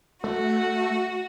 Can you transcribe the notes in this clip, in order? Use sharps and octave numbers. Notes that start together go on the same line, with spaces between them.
A3 F#4